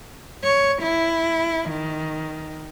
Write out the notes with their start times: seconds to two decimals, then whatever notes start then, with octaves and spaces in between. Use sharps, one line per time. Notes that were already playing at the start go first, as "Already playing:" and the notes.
0.44 C#5
0.82 E4
1.69 D#3